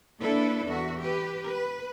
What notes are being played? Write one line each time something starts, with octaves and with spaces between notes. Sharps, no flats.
A#3 D4 E4 A4 B4
E2 F#4 E5
G4 B4
B4